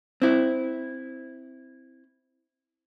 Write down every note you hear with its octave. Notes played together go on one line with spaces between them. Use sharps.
C4 E4